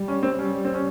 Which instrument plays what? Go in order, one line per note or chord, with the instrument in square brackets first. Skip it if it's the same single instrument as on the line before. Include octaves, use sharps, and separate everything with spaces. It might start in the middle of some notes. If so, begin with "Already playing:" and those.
Already playing: [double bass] G3
[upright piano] C#4
C4
[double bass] G3 [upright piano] C#4
[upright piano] C4
C#4